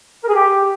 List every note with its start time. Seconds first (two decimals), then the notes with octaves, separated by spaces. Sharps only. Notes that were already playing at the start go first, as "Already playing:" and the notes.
0.23 A#4
0.28 G#4
0.33 G4